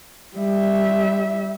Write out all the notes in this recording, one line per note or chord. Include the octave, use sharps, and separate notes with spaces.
G3 E5